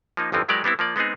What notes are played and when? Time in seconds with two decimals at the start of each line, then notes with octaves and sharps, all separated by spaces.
0.17 F3 A#3 D#4
0.32 G1 F2 E3 F3 C4
0.48 E3 F#3 G#3 G4 A#4 D5
0.64 G3 B3 C4 E4
0.79 F3 A#3 D5
0.96 G#3 B3 C4 D#4 G#4